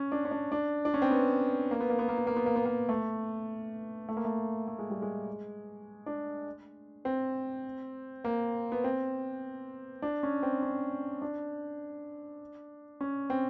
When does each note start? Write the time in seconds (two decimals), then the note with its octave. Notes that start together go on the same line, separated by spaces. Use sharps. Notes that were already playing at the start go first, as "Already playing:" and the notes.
Already playing: C#4
0.12 D4
0.25 C#4
0.31 D4
0.52 D4
0.85 D4
0.94 C#4
1.02 C4
1.11 B3
1.71 A#3
1.80 B3
1.90 A#3
1.99 B3
2.09 A#3
2.18 B3
2.27 A#3
2.36 B3
2.46 A#3
2.56 B3
2.65 A#3
2.89 A3
4.09 A3
4.17 A#3
4.25 A3
4.68 A3
4.79 G#3
4.90 G3
5.02 G#3
6.06 D4
7.05 C4
8.24 A#3
8.72 B3
8.84 C4
10.02 D4
10.23 C#4
10.43 C4
10.63 C#4
11.22 D4
13.01 C#4
13.30 C4